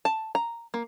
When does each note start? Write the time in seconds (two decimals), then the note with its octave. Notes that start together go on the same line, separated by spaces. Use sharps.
0.05 A5
0.35 A#5
0.74 A#3